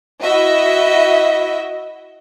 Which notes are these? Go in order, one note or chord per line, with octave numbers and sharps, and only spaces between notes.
E4 F#4 D#5 E5